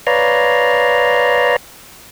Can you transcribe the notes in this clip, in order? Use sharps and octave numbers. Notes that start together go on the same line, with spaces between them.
B4 C#5 D5 F5 A#5